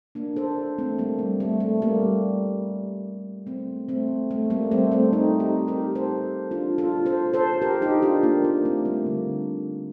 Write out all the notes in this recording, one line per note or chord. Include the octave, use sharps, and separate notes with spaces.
A#3 D4
A4 C5
A3 C4
G3 A#3
G3
A3
A3
G3 A#3
A3 C4
A3 C4
A3
G3 A#3
A3 C4
A3 C4
C4 D#4
D#4 G4
G4 A#4
A4 C5
D4 F4
F4 A4
A4 C5
A4 C5
G4 A#4
D#4 G4
D4 F4
A#3 D4
A#3 D4
A3 C4
G3 A#3
D3